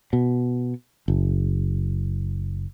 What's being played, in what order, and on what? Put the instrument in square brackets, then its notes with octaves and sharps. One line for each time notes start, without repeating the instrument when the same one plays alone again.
[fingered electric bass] B2
F#1